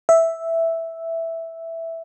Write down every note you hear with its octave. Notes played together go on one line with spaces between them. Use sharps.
E5